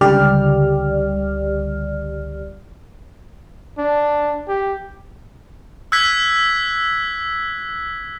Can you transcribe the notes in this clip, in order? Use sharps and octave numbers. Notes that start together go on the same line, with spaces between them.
C#2 D3 G3 G4 D5 F6
D4
G4
E6 F#6 G#6 B6